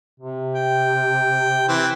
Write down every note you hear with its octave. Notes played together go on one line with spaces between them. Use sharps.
C3
G5
E3 C4